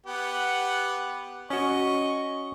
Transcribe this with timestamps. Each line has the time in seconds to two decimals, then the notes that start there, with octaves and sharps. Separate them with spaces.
0.06 B3 G4 F#5
1.50 C#4 F#4 D#5 C#6